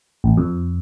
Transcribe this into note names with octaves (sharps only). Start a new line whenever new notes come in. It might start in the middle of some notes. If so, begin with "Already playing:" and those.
A1
F2